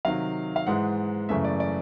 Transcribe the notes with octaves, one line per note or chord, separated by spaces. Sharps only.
C3 D#3 F#3 F5
F5
G#2 E3 G#3 F#5
F#2 C#3 E3 A3 E5
D5
D5